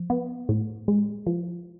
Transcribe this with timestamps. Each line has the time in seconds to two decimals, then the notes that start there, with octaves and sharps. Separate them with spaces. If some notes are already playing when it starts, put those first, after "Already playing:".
Already playing: F3
0.10 B3
0.49 A2
0.88 G#3
1.26 F3